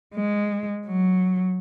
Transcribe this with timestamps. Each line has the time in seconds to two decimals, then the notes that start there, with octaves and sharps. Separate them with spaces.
0.14 G#3
0.86 F#3